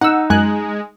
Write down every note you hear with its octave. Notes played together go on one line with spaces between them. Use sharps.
D#4 F#5 E6
F#2 G#3 G#5 F#6